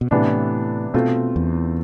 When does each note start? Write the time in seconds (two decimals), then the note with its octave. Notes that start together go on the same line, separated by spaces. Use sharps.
0.01 B2
0.11 A2 C3 E3 B3 D4
0.94 B2 A3 C4 F4
1.36 E2